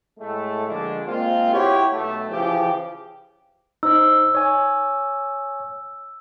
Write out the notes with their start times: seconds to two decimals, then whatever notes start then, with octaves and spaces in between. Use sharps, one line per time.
0.19 A2 G#3 A3
0.67 D3 F3 G#3 A#3 D4
1.06 G#3 A#3 C4 F4
1.52 E4 F#4 G4 C#5
1.92 B1 A3
2.30 C#3 E3 F3 G4
3.83 D#4 C5 D#5 E6
4.35 C#5 G#5